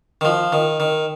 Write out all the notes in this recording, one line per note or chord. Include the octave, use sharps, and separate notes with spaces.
D#3
F3
D#3
D#3